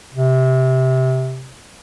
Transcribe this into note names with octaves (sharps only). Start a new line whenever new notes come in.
C3